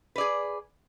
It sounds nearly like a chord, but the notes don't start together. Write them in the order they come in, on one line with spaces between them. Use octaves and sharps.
B4 D5 G#4